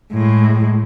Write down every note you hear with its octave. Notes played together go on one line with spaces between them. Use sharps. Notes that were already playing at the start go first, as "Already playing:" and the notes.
A2 G#3